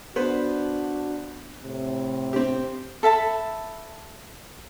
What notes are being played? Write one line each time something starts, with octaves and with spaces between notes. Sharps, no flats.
B3 D4 F#4 B4 C5
A2 C3
C4 G4
A4 E5 A5 B5